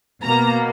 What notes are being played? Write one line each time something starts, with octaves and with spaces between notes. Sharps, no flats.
B2 A#3 A#5